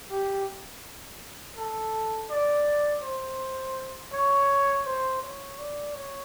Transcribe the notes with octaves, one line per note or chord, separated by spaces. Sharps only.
G4
A4
D5
C5
C#5
C5
C#5
D5
C#5